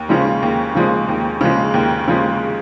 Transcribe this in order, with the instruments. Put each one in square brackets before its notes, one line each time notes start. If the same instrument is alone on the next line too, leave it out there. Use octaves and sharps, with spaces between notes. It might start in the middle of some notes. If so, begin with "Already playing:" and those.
Already playing: [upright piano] D#2
C#3 F3 G#3
D#2
C#3 F3 G#3
D#2
C#3 F3 G#3
D#2
C#3 F3 G#3